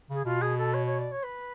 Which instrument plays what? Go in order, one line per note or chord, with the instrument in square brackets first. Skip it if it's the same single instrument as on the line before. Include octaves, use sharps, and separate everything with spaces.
[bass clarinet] C#3 [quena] G#4
[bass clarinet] B2 [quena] F4
[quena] G#4
A4
C#5
C#5
D5
C#5
B4